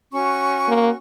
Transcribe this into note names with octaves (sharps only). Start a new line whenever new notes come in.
C#4 F#4 C#6
A#3